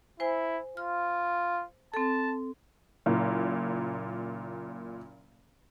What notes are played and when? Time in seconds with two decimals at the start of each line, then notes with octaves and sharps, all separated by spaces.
0.20 E4 C5 G#5
0.77 F4 F6
1.94 C4 A4 A5
3.06 F#1 A#2